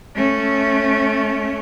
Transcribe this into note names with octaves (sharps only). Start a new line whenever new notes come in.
A3 C#4